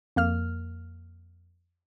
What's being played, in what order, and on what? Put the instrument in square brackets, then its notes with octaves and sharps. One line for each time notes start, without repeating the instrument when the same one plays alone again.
[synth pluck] F2 A#3 F6